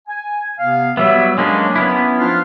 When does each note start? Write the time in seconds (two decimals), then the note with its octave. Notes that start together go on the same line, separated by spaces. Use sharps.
0.08 G#5
0.59 C3 B3 F5
0.97 F#3 G3 B3 C#5 E5
1.38 F#3 G#3 A#3 C#4 D4
1.76 B3 C#4 E4
2.19 F3 D4 F4